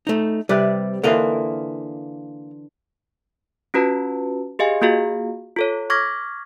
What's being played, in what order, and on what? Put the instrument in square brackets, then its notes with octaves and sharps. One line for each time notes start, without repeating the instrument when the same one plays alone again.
[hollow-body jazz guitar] A3 D#4
[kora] C3 B4 D5 [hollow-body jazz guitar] G3
[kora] D3 E3 F4 [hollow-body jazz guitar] A#3 A#4 D#5
[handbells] C#4 F4 F#4 B4 A5
G4 G#4 D#5 F5 G#5
A#3 F4 F#4 G#4 F5
F4 A4 C#5
C#6 D6 F6 G#6 A#6 B6